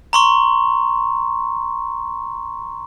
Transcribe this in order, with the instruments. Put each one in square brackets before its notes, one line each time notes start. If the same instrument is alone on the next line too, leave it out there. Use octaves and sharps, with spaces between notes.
[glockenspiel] A#5 C6 C#6